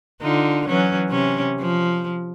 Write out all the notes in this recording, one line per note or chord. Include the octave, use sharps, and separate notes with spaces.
D3 D#4 F4
E3 F#3 C#4
C3 C#4
F3